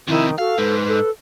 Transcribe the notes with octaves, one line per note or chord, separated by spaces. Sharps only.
F2 C3 D#3 E4
F#4 A4 F5
G#2 B4
A4